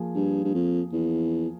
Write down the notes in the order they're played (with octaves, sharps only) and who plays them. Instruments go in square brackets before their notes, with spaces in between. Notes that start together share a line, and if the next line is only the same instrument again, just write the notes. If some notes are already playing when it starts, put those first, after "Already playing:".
Already playing: [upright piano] F3 A#3 F4 G#4
[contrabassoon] G2
G2
F2
E2